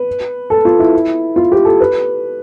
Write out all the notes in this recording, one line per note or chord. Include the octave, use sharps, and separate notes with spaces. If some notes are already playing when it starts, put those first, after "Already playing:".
Already playing: B4
A4
F4
E4
F4
G4
A4
B4